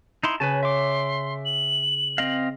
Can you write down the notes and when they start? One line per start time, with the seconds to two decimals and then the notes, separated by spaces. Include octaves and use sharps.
0.23 D#4 E4 C6
0.40 C#3 B4 G#5 A5
0.63 E5 C6 D6
1.45 F#7
2.18 C4 D#5 F5